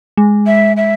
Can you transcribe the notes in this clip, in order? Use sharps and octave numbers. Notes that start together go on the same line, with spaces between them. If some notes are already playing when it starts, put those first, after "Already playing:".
G#3
E5
E5